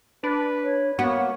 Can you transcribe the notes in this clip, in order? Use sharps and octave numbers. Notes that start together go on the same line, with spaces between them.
D4 B4
C#5
A#3 B3 F#4 C#5